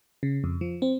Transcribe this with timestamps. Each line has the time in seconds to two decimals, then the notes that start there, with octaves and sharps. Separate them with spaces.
0.23 C#3
0.44 F2
0.61 F3
0.82 C4